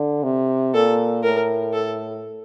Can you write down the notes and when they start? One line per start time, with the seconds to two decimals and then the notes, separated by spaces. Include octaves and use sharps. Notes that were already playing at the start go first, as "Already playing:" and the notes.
Already playing: D3
0.23 C3
0.74 A#2 A4
1.23 A2 A#4
1.73 A4